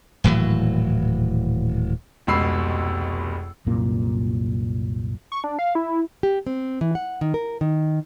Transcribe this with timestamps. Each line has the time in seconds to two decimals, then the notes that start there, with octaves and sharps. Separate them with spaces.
0.24 D#1 A2 E3 F#3
2.27 F1 C#2 B2 B5 E6 C7
3.67 C2 F#2 A#2 A#3
5.32 C#6
5.44 D4
5.59 F5
5.75 E4
6.23 G4
6.47 C4
6.81 E3
6.95 F#5
7.21 D#3
7.34 A#4
7.61 D#3